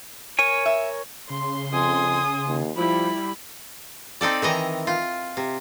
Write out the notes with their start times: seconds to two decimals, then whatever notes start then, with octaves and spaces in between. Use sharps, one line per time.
0.39 A#4 C#5 G#5
0.66 E5
1.30 C#3 C6
1.73 F2 G#5 D#6
2.47 D#2
2.77 F3 G3 E4 B5
4.21 C4 D#4 A4 D5
4.42 D#3 E3 D#5 A#5
4.87 F4
5.37 C3